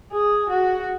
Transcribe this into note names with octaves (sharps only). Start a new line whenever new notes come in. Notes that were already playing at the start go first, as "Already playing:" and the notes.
G#4
F#4